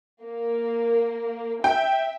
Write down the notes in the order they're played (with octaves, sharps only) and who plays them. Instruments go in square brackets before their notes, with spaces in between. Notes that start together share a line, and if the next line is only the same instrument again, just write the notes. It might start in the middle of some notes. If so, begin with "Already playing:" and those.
[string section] A#3
[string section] E5 [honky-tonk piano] G5